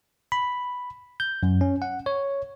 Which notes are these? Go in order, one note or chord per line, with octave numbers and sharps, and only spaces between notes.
B5
G6
F#2
C#4
F#5
C#5